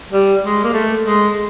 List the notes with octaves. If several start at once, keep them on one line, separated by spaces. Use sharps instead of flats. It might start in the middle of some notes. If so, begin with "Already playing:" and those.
G3
G#3
A#3
A3
G#3